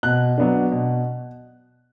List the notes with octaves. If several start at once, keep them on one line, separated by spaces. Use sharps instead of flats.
B2 F#6
F#3 B3 D4
B2